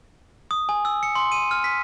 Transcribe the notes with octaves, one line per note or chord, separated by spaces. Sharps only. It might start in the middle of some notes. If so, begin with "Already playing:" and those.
D#6
G#5
E6
C#7
C6
D#7
F6
B6